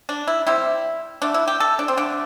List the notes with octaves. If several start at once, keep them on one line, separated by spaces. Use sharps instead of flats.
D4
E4
C3 G3 E4
D3 A3 D4
E4
G4
A4
D4
C4
D3 A3 D4